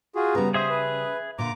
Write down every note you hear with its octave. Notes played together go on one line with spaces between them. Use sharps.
F4 F#4 G#4
C#3 G3 B3 A#5
G#4 C5 E5 D#6
B4
A#2 D3 A#5 D6